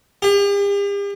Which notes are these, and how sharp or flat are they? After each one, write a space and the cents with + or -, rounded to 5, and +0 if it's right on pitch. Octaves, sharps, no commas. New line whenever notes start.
G4 +45